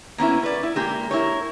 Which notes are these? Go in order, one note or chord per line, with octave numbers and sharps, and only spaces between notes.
A#3 B3 C#4 E4
B4 D5
E4
G#3 A#3 G4
E4 A#4 C#5